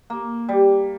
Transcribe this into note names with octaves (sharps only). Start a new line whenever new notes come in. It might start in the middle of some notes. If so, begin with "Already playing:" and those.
A#3
G3